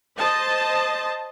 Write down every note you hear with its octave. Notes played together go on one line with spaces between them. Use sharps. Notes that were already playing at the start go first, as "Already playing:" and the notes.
C5 D#5 A5